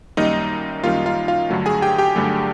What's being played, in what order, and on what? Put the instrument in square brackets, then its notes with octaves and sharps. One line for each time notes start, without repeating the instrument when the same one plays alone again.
[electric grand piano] F#2 D#3 G3 A#3 D#4 D#5
F#2 D#3 G3 A#3 F4 F5
F4 F5
F4 F5
G2 D3 F#3 A3
G#4 G#5
G4 G5
G4 G5
G2 D3 F#3 A3